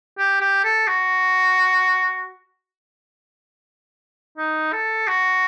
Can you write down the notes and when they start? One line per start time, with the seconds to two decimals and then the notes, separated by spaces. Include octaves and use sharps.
0.18 G4
0.41 G4
0.64 A4
0.88 F#4
4.38 D#4
4.73 A4
5.08 F#4